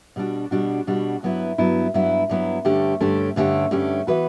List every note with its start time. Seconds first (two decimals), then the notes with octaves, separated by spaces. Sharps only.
0.16 B2 G3 D4 F#4
0.51 B2 G3 D4 F#4
0.87 B2 G3 D4 F#4
1.23 G2 F#3 B3 E4
1.58 G2 F#3 B3 E4
1.94 G2 F#3 B3 E4
2.29 G2 F#3 B3 E4
2.65 G2 D3 A3 C#4 G4
3.01 G2 D3 A3 C#4 G4
3.36 G2 D3 A3 C#4 G4
3.71 G2 D3 A3 C#4 G4
4.07 E3 B3 F#4 B4